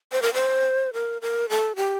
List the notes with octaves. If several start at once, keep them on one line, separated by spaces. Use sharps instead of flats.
C5
A#4
C5
A#4
A#4
A4
G4